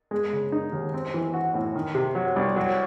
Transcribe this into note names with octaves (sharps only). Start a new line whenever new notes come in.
G#3
C#3
D#4
D#2
C4
E3
F#4
A2
D#3
C3
F#3
C2
F#3